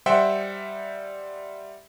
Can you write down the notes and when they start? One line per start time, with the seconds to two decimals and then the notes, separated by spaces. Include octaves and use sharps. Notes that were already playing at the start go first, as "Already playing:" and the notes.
0.06 G3 C5 E5 F#5 G5